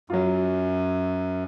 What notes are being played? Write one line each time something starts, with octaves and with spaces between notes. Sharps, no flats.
F#2 F#3 F4